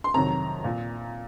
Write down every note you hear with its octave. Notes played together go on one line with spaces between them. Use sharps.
C6
F2 C3 D#3 F#3 A#5
A#2